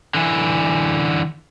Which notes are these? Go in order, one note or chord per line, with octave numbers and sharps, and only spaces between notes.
D3 E3